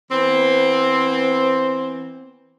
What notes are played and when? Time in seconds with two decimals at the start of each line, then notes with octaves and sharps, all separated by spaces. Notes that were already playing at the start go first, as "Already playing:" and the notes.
0.12 E3 B3 C4